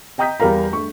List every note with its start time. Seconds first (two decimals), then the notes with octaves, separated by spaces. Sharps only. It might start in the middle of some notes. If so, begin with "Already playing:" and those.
0.18 D#5 G5 A#5 D#6 G6 B6
0.40 E2 G3 A#4 F5 A#5
0.71 G2 A3 C#6